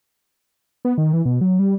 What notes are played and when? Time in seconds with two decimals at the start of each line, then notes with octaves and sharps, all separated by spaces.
0.85 B3
0.98 D#3
1.13 E3
1.25 B2
1.41 F#3
1.59 G3